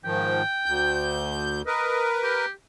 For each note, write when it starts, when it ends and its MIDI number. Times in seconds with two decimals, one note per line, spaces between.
0.05 0.42 44
0.05 0.42 51
0.05 0.42 53
0.05 1.22 79
0.66 1.62 38
0.66 1.62 91
1.67 2.45 70
1.67 2.45 71
1.67 2.06 75
2.23 2.50 67